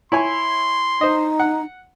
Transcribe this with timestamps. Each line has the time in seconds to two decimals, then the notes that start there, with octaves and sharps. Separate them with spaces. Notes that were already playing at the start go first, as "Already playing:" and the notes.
0.12 E4 C#5 G#5 C6
1.01 D#4 C5 D#5
1.40 F#5